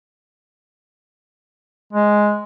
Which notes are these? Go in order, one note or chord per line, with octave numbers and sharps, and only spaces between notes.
G#3